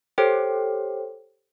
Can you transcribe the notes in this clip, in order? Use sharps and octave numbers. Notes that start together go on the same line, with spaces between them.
G4 A4 C5 C#5 G5